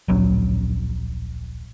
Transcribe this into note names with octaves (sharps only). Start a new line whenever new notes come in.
D1 A#1 F#3 C#4